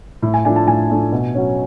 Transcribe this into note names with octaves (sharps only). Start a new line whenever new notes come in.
A2
G#5
F3 A3 D4 G#5
A5
A2 G#5
F3 A3 D4
B2
F#3 C#4